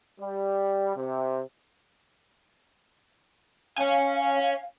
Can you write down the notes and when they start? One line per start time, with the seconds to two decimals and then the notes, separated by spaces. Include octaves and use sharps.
0.21 G3
0.96 C3
3.78 C#4 C#5 F5 G#5